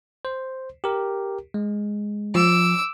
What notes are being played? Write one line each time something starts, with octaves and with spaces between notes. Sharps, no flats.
C5
G4 A#4
G#3
F3 D6 E6